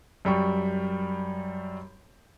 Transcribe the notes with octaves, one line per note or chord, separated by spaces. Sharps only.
F#2 G3 G5 C#6